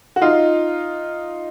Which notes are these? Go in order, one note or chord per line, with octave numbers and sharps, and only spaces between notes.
F#4
D#4 F4